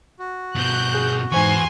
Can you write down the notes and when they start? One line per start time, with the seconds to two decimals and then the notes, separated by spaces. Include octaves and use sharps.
0.19 F#4
0.55 G2 B2 F#6 G6
0.95 G#4
1.32 E2 G#2 C5 G#5 C6 C#6